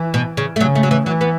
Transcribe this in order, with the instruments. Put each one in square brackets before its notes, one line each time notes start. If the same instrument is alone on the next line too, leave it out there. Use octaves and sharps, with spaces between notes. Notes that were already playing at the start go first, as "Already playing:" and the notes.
Already playing: [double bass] E3
[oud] B2
C#3
A3
[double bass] C#3 [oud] F#3
[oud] A3
F#3
E3
[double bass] E3 [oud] F#3
[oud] B3